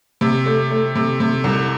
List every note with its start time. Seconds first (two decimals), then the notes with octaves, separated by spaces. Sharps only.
0.21 C3
0.46 A3
0.70 A3
0.95 C3
1.20 C3
1.44 C2